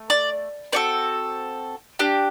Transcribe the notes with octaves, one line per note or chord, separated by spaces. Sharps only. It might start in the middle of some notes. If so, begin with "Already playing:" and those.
Already playing: A3
D5
C4 F#4 A4 D5
D4 G4